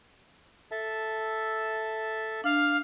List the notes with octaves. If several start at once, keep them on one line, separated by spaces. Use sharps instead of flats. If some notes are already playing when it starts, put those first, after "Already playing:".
A4 E5 A5
D4 F5